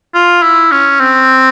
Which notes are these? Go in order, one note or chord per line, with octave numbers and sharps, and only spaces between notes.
F4
E4
C#4
C4